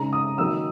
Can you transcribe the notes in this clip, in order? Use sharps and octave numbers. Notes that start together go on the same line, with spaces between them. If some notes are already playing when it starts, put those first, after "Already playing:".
Already playing: C#3 G#3 D#4 A#5
D#6
D#3 F#3 A#3 D#4 E6